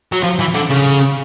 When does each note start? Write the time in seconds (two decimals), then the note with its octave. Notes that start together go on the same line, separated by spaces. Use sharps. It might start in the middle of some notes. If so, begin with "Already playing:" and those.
0.12 F#3
0.23 F3
0.39 E3
0.55 D3
0.70 C#3